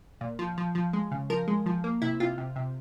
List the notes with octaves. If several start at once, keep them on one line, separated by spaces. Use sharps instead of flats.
A#2
F3
F3
F3
G#3
C#3
F3 A#4
G#3
F3
A#3
C3 E4
C3 F4
C3
C3